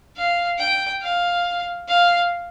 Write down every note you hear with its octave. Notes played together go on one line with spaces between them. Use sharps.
F5
G5
F5
F5